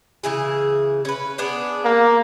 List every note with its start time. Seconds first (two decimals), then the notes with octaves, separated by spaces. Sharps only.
0.23 C#3 E3 G#4
1.05 C#4 B4
1.38 B3 D4 G#4
1.85 A#3